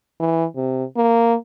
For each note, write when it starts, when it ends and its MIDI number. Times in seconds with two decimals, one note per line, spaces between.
0.20 0.45 52
0.56 0.84 48
0.97 1.35 58